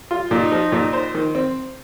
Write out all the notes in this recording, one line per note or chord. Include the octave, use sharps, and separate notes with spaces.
F4
A#2 D#4
F3
A#2
C5
D#3
C4